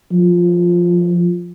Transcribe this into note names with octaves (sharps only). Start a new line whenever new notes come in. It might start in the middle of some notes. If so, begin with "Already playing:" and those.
F3